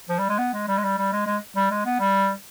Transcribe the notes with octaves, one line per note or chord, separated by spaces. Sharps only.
F3
G3
G#3
B3
G#3
G3
G#3
G3
G3
G#3
G#3
G3
G#3
B3
G3